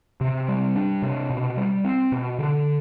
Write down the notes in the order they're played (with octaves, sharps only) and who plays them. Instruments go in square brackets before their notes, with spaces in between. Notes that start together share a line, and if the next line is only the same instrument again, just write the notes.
[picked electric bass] C3
G3
D4
C3
B2
G3
C4
B2
D3